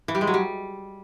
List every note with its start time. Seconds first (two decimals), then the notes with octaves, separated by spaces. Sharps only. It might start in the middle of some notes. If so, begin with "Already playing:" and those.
0.08 E3
0.15 G3
0.21 G#3
0.27 F#3
0.34 G3